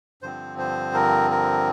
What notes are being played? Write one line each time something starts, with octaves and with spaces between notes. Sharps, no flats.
G2 D3 F3 C4 C5
C5
A#4
A#4